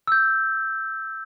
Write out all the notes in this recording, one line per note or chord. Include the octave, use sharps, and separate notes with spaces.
E6 G6